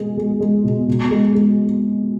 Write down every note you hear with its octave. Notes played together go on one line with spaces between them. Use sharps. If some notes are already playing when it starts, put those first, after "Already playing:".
Already playing: B2 G#3 G#4
G#3
G#3
B2
B2
G#3
G#3